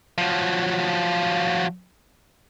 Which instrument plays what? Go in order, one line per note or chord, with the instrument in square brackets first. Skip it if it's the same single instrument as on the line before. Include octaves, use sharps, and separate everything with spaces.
[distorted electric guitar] F3 F#3